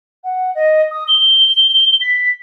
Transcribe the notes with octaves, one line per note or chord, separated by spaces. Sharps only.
F#5
D#5
D#6
G7
B6